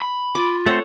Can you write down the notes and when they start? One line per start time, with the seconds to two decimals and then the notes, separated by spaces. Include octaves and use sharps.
0.02 B5
0.35 F4 D6
0.66 A3 C4 A4 C5 C#5 F#5